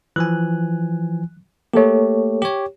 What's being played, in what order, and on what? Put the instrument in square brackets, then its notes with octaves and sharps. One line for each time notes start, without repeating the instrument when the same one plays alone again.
[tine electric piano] E3 F3 G#5 [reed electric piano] F#6
[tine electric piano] A3 G4 [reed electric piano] A#3 A4 C#5
[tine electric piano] G4 C#5